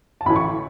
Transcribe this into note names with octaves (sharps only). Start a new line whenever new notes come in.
A5
A1 A2 E3 B5
C#6